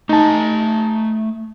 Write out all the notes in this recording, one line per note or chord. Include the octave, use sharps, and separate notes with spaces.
A3 D#4 G#5 A5